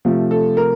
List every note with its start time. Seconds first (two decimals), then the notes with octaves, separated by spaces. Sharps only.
0.05 C3 F3 A3
0.31 A4
0.57 A#4